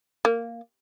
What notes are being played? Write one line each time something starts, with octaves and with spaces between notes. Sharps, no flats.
A#3